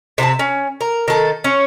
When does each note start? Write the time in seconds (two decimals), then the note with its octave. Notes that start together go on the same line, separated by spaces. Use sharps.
0.18 C3 C4 G4 A5
0.39 C#4
0.81 A#4
1.08 D#3 A4
1.44 C#4